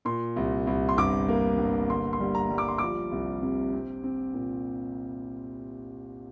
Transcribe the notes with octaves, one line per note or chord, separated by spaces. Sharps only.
A#2 C6
C2
C2
C6
G1 D6
A#3
G1
D3 C6
C6
G3
A#5
G3
D6
C6
F3 D6
C2
C3
C4
C4
A#2